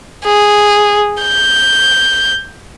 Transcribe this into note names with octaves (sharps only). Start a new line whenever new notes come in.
G#4
G6